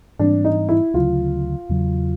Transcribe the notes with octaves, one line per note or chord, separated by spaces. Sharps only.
G#2 E3 G3 C4 D4
D#4
E4
D2 C#3 F#3 F4
E2 C#3 F#3